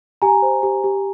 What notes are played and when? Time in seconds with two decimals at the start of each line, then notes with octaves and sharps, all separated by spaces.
0.22 G4 G#5 A#5
0.42 C5
0.63 G4
0.84 G4